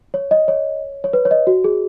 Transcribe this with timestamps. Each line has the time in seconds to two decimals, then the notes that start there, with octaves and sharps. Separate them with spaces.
0.14 C#5
0.31 D#5
0.48 C#5
1.04 C#5
1.13 B4
1.25 C#5
1.31 D#5
1.47 F#4
1.64 G#4